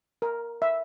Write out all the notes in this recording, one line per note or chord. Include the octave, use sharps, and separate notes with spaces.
A#4
E5